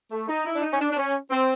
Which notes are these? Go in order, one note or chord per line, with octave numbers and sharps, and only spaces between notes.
A3
D#4
E4
D4
D#4
C#4
D4
D4
C#4
C4